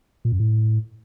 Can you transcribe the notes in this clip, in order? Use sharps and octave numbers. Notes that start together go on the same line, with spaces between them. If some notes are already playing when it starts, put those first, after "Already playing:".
A#2
F#2
A2